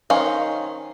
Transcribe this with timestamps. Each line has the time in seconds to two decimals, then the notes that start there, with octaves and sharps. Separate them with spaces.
0.10 D#3 C#4 C5 F5